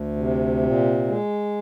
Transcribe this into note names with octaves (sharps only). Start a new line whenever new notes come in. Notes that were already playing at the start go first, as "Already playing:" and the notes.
Already playing: D2
C3
A#2
G#3